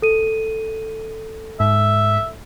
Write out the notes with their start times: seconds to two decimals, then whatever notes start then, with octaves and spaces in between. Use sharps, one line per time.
0.02 A4 D#7
1.60 G#2 E5